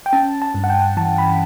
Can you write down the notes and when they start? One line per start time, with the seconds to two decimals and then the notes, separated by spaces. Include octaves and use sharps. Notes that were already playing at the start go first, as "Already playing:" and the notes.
0.06 G5
0.13 C#4 A5
0.42 A5
0.55 G2
0.64 F#5
0.69 G5
0.97 E3 A5
1.18 B5